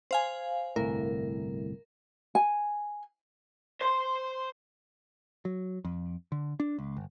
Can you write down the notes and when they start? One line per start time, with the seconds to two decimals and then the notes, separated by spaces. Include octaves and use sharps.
0.11 C5 F5 G#5
0.76 G1 C2 A2 A#4
2.35 G#5
3.81 C5 C6
5.45 F#3
5.85 F2
6.32 D3
6.60 D4
6.78 C#2
6.97 G1